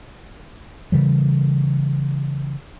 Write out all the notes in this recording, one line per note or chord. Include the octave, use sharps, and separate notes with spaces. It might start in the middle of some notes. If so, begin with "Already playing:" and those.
C#3 E3 G3